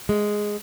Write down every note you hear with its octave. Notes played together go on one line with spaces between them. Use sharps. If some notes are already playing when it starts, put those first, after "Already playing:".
G#3